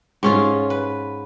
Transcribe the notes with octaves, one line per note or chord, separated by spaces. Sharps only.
G#2 C#4 F4
B4